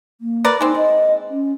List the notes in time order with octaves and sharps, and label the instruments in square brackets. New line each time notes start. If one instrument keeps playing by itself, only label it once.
[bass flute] A#3
[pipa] A#4 B4 D5
[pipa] G#3 C4 [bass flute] D#4
[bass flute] D#5
C#4